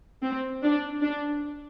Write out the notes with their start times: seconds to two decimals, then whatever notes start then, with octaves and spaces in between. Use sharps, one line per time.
0.23 C4
0.64 D4
1.03 D4